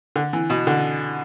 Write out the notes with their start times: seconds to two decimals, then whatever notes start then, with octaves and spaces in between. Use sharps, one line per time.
0.16 D3
0.33 E3
0.50 B2
0.67 D3